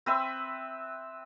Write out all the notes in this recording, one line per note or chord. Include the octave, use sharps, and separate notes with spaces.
C4 B4 E5